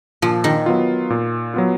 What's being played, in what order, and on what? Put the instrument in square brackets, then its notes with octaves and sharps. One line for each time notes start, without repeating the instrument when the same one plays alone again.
[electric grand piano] A#2 [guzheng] F3
[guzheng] D#3
[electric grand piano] F#3 B3 F4
A#2
F#3 B3 F4